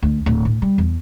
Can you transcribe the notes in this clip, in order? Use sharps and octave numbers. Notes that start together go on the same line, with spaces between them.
D2
D1
A2
G3
E2